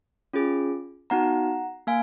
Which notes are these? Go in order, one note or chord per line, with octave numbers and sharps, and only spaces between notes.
C#4 F4 G#4
B3 D#4 F#4 F#5 A#5
A#3 F5 G#5